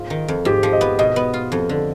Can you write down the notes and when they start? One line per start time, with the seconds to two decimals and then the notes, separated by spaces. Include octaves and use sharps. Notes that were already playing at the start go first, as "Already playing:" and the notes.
Already playing: G#2 F4
0.10 D#3
0.28 F2
0.45 G#2 G4
0.63 F3
0.73 D#5
0.81 B3
0.99 B2 D#5
1.16 B3
1.34 F4
1.52 F2
1.69 D3